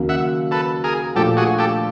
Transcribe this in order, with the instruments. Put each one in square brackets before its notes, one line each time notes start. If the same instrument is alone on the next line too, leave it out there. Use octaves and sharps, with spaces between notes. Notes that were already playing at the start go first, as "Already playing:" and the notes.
Already playing: [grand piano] D#2 C#3 F#3 A#3
[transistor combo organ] E5 F#5
A4 B4
G#4 A#4
[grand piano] A#2 F3 A3 D4 [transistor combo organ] G4 A4
[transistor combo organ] F#4 G#4
G4 A4